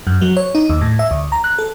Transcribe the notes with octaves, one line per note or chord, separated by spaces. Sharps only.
F#2
F#3
C#5
D#4
D#2
A2
E5
D2
A#5
F#6
A4